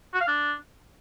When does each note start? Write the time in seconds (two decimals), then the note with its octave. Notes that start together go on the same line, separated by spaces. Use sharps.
0.14 F#4
0.21 F5
0.27 D4